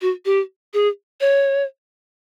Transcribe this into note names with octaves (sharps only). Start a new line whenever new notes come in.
F#4
G4
G#4
C#5